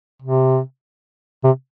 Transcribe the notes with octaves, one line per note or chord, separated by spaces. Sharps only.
C3
C3